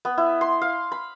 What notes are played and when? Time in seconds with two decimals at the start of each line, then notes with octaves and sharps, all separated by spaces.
0.05 B3
0.18 E4
0.41 C6
0.62 F5
0.92 B5